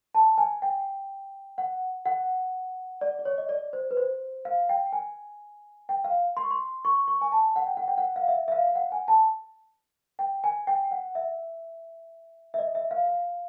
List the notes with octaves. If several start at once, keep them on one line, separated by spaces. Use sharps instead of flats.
A5
G#5
G5
F#5
F#5
D5
D5
C#5
D#5
D5
C5
B4
C5
F5
G5
G#5
G5
F5
C6
C#6
C6
C#6
C#6
G#5
A5
F#5
G5
F#5
G5
F#5
F5
E5
E5
F5
F5
F#5
G#5
A5
G5
G#5
G5
F#5
E5
E5
D#5
E5
F5
F5